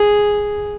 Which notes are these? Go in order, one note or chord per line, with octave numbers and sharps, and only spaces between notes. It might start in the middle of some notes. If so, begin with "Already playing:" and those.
Already playing: G#4